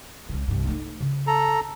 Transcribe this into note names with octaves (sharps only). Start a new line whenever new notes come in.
C#2 C#3
C2 G2
A3 D#4
C#3
A4 A#5